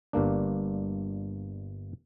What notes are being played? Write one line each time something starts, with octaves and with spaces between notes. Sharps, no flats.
G1 G2 A#3 D4